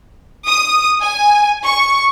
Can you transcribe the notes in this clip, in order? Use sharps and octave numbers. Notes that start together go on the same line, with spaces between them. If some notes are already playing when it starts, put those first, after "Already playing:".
D#6
G#5
C#6